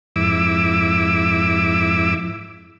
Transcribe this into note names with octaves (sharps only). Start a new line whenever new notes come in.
F2 G#2 E4 D6 E6